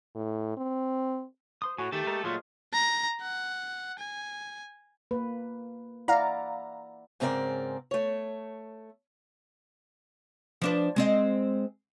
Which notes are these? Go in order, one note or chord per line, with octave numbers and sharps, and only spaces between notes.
A2
C4
C5 C6 D#6
A2 F#4 G#5
D#3 A3 G4 A4
G#3 A#4 A#5
A#2 F#3 A3 F4 G#4 C5 D#5
A#5
F#5
G#5
A#3 B4
E4 D5 F5 F#5 A#5
G#2 C#3 C4 D#4 A#4 D5
A3 C#5
F3 D4 B4
G#3 C4 D#5